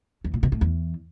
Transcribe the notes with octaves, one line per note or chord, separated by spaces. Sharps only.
E2
A#2
B2
A2
E2